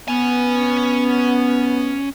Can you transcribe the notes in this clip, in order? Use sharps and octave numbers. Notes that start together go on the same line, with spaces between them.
B3 C#4 G#5